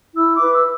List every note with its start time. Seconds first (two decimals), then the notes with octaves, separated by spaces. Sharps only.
0.15 E4 E6
0.34 D6
0.41 B4
0.53 E6